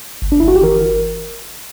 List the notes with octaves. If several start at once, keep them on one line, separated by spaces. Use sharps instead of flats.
G1
D4
G1 E4
F#4
G4
E3 A#4